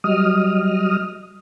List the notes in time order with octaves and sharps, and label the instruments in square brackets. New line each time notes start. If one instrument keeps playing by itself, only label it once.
[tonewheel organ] F#3 G3 D#5 D#6 F6